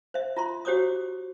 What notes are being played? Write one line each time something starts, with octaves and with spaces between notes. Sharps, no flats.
C5 E5
F4 A#5 C6
F#4 G4 C5 C#5 D6 D#6